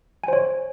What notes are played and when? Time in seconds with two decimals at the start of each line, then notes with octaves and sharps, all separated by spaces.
0.24 G#5
0.28 C5
0.33 C#5